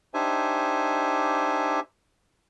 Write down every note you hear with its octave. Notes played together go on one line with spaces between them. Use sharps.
D4 D#4 G4 C5 E5 G#5